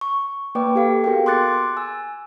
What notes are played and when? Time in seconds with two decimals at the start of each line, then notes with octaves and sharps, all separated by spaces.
0.01 C#6
0.55 A#3 B4 D5 G5 D6
0.75 G4 A4 F5
1.04 B3 F#4 G#4 A#4 G5
1.26 C6 D6 F#6 A6 C#7
1.77 G#5 E6